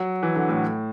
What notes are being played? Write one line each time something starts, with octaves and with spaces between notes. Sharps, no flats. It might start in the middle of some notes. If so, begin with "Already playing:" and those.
Already playing: F#3
E3
D3
A2